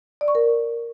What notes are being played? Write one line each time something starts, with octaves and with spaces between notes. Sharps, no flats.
D5
C#6
A#4